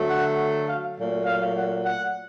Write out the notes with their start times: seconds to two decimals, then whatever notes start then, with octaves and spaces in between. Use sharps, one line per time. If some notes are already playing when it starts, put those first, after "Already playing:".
Already playing: D3 F#3 A3
0.09 F#5
0.67 F5
0.97 A#2 F#3 A3
1.26 F5
1.56 F#5
1.85 F#5